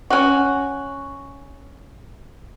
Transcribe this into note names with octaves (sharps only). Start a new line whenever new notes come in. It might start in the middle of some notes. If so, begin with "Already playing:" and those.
C#4 F#4